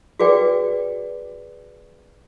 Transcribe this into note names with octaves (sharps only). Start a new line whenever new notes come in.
F#4 G#4 B4 D5 G5